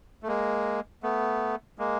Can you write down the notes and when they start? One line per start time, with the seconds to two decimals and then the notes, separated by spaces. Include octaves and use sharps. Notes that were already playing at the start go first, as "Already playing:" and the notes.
0.23 A3
0.28 G#3 A#3
1.03 A3 B3
1.78 G#3 A#3